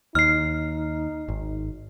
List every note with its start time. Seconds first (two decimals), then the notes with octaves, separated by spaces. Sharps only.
0.15 D#2 D#4 F6 C7
1.28 G#1